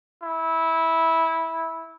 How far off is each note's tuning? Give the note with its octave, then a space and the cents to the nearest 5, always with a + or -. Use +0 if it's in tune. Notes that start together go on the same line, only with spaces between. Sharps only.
E4 -15